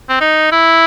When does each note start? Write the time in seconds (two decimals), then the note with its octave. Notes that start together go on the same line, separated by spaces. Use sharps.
0.09 C4
0.21 D#4
0.52 E4